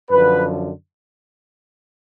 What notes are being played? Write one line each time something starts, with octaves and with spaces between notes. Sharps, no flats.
F#2 D3 F3 B4